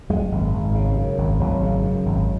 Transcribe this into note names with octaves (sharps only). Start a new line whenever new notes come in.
F#2 G#3
G#1
G#1
C#3
F#2
G#1
G#1 F#3
C#3
F#2
G#1